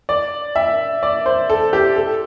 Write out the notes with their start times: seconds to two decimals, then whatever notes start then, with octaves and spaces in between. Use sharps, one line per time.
0.09 D5
0.56 E5
1.03 D5
1.26 C5
1.50 A4
1.73 G4
1.96 A4